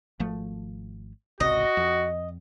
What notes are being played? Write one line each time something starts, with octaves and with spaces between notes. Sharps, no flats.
G#1 F3 A3
G#1 C#2 C3 F#4 D#5
F2